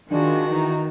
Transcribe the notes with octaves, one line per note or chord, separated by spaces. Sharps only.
D#3 G#3 D4 F4 F#4
E3 D#4 A#5